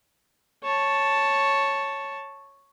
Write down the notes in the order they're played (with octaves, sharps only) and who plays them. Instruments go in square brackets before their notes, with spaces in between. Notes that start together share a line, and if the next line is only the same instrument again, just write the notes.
[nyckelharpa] C#5 A5